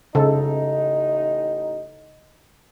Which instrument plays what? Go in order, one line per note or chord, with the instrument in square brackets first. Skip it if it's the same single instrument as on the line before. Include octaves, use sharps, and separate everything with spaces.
[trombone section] A1 D#4 [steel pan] C#3 A4